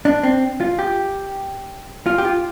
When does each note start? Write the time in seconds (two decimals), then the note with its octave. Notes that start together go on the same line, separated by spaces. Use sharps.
0.05 D4
0.23 C4
0.61 F4
0.79 G4
2.06 F4
2.18 G4
2.25 F4